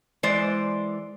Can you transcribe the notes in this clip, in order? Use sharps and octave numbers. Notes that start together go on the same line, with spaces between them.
E3 G#3 C5 D5